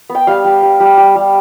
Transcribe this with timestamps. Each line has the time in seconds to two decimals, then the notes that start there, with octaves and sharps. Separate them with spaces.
0.10 B3
0.15 G5
0.27 G3 F5
0.44 G3
0.63 G3
0.80 G3
0.97 G3
1.16 G3